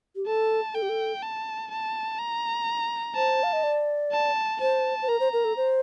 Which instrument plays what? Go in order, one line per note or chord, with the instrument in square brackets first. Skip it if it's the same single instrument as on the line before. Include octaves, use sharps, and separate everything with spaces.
[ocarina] G4
[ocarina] A4 [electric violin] A5
[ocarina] A4 [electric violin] G5
[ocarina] G4
A4
[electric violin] A5
A5
A#5
[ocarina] C5 [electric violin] A5
[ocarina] F5
D#5
D5
[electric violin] A5
[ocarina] C5 [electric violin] A5
[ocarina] C5
[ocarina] A#4 [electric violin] A#5
[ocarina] C5
A#4
A4
C5